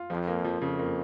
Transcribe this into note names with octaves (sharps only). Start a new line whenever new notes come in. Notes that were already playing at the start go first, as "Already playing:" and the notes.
Already playing: F4
F2 F3
A#3
F3
F2 C#3
A#3